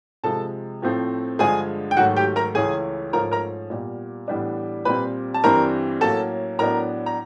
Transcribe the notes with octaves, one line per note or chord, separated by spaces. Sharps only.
C3 F3 G#3 A4 A5
A2 F3 A3 C4
G2 D3 F3 G#3 G#4 G#5
G5
G#2 D#3 F#3 A3 F#4 F#5
G4 G5
A#4 A#5
C#2 C#3 E3 A3 C#4 G#4 G#5
G#2 F3 A3 C#4 A#4 A#5
A#4 A#5
A#2 G3 B3
A2 E3 G3 B3 D4
A#2 G3 C4 B4 B5
A5
G2 E3 G3 C4 A#4 A#5
A2 F#3 A#3 C#4 A4 A5
A2 F#3 B3 D4 A#4 A#5
A#5